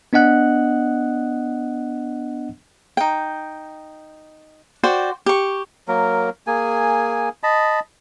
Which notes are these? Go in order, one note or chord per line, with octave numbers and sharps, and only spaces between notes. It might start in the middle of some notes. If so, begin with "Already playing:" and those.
B3 D4 D#5 F#5 F#6
D#4 G5
F#4 C5 D5 G5
G4 C#6
F#3 A#3 A#4
A#3 G#4 G#5
D#5 A5 B5